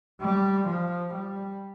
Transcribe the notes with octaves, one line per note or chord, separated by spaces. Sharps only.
G3
F3
G3